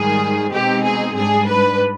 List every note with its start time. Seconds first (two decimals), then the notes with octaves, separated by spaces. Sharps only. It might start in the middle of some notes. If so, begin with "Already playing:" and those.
Already playing: G#2 D#3 G3 G#4
0.52 B2 G#3 C4 D#4 G4
0.85 G#4
1.16 G#2 G3 D4 G#4
1.48 B4